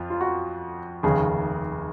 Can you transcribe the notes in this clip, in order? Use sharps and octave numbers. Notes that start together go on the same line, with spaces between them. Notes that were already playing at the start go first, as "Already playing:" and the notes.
Already playing: F2 F4
F4
F#4
F1 D#2 C#3 G#4